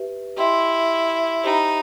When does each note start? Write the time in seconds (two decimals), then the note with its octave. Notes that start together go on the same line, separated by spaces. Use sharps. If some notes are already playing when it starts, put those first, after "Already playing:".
Already playing: G4 B4 E5
0.37 E4 G4 D#5 G5 C6
1.44 D#4 G4 C5 E5 G5 B5